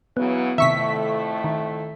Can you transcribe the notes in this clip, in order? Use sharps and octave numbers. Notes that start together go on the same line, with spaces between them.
C#3 E3 F#3 B3
F2 A2 C3 D#3 A3 E5 C#6 B6
D#3